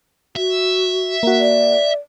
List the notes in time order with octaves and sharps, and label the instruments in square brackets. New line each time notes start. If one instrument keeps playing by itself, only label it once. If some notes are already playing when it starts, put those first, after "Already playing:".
[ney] F#4 [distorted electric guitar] E5
[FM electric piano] A#3 F#4
[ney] D5